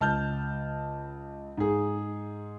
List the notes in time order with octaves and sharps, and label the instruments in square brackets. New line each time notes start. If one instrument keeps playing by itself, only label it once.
[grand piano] C#2 A5 F6 G6
G#2 G#4